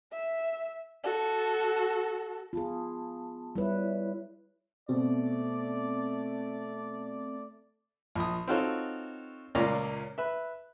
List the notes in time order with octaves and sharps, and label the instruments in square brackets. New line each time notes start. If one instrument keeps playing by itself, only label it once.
[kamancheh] E5
F#4 A4
[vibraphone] B3 A5 [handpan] F4 G#4
[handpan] G3 B4 [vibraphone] E4 C#5 E5
[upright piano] B2 [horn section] A3 D5 [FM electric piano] C4
[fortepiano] A#1 D#6
C4 D#4 F4 F#4 A4 C#5
C#2 A#2 A#3 C#4 D5 A#5
B4 E5